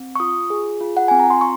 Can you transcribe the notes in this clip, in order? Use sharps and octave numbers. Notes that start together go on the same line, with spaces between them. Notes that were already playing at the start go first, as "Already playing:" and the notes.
Already playing: C4
C#6
F4 D#6
G#4
F4
F#5
C4 G#5
A#5
C6
C#6